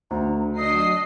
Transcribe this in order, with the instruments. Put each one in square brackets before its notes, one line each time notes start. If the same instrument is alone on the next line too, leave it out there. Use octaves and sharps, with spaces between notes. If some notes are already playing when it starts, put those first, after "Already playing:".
[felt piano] D2 [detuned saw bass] D3 [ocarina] A#5
[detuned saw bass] F#3 [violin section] D4 D#5 C7 [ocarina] D#6